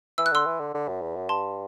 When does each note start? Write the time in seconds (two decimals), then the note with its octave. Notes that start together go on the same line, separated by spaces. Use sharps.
0.18 E3 E6
0.26 F#6
0.32 D3 C6 E6
0.46 E3
0.60 D3
0.74 D3
0.88 F#2
1.01 E2
1.16 F#2
1.29 G2 A5 C6